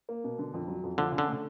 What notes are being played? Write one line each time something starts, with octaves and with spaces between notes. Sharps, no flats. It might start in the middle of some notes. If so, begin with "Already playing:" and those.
A#3
B2
D3
F2
F#3
F2
D3 F3
C#4
D3
A3